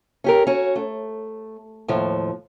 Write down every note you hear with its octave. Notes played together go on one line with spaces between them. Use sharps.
C#4 G4 A#4
C#4 F#4
A3
D#2 A2 F3